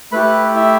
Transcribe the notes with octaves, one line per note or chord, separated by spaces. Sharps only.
A3 E4 G4 B4 B5
E4 E5